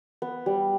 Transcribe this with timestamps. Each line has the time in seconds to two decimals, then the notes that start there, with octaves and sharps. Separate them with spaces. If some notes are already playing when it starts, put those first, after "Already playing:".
0.22 B3
0.46 G3